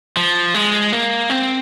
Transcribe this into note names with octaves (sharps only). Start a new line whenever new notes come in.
F3
G#3
A#3
C4